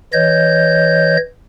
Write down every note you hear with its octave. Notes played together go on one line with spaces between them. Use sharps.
E3 C#5 D#5 G6